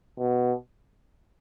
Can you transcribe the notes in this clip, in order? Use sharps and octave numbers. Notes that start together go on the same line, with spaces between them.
B2